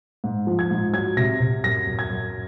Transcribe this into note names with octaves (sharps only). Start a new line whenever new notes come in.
G#2
F3
G#6
G#2
F#3 G#6
C3 A#6
C3
F#2 A#6
F#2
G#6
F#2